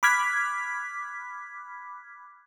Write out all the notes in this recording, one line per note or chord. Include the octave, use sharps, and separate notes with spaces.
B5 D6 F6 F#6 G#6 B6